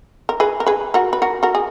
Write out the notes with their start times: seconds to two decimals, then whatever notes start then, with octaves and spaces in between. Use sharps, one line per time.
0.29 A#4
0.40 G#4 B4
0.60 A#4
0.66 G#4 B4
0.94 F#4 A#4
1.13 B4
1.22 F#4 A#4
1.43 F#4 A#4
1.55 G#4